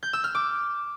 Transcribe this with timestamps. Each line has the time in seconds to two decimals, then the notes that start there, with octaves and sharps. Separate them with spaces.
0.03 G6
0.13 E6
0.24 F6
0.35 D6